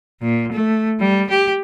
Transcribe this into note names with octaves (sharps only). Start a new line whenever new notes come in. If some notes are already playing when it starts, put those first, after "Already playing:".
A#2
A3
G3
G4